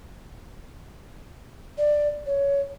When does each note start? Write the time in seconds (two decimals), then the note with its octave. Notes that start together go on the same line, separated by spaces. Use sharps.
1.78 D5
2.26 C#5